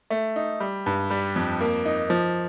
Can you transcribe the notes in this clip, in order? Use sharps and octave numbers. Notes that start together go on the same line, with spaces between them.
A3
D#4
G3
G2
G3
F2
A#3
D#4
F3